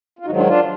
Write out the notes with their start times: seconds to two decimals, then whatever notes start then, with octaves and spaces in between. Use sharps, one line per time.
0.19 F4
0.26 G#2 D#3 F#3 D#4 F#4
0.36 D4 F4
0.47 D4 F4